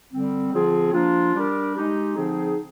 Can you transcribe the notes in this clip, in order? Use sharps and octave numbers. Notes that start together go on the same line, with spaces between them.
D3 G3 C4
D3 F3 C4 F4 G#4
F3 A#3 D4 F4
G3 D4 G4 A#4
G#3 D#4 G4
D3 F3 C4 D#4 G#4